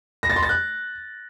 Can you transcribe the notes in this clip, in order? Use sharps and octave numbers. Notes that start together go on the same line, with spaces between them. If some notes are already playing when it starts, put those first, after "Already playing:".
A#6
A6
C6
A6
F#6